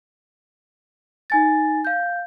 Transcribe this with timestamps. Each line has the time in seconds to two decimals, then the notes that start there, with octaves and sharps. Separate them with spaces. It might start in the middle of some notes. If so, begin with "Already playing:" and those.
1.30 D#4 G#5 A6
1.85 F5 G6